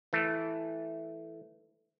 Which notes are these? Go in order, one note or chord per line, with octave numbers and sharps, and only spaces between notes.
E3 A3